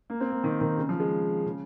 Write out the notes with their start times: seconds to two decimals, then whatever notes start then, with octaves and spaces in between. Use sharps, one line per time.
0.10 A#3
0.20 C4
0.31 A#3
0.44 D#3
0.61 D#3
0.78 C#3
0.89 F3
1.00 G#3
1.46 C#3